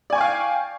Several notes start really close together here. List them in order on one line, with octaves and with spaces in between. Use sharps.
D5 G#5 C#6 G5 F5